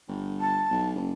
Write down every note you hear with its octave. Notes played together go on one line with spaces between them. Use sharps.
G1
A5
B1
F#1